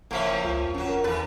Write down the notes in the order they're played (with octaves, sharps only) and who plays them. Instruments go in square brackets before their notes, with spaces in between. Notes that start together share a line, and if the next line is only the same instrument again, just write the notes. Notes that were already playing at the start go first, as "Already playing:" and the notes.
[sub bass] F#1 [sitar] A2 F3 C#4 [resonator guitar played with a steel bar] A#3 C5 E5
[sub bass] C#2 [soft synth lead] F4
[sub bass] E2
[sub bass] F#1 [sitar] F#2 F#3 [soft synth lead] C#4
[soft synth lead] A#4
[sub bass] E2 [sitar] E3 B4 [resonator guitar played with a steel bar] A4